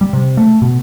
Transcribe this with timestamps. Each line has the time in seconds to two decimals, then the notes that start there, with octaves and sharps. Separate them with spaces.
0.01 G3
0.13 C3
0.37 A3
0.62 B2